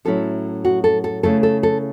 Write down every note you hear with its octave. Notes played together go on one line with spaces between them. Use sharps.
A2 F#3 C#4 E4 A4
F#4
A4
A4
C#3 A3 E4 A4
A4
A4